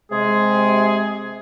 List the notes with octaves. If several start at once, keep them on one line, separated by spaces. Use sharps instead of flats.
C3 G#3 G#4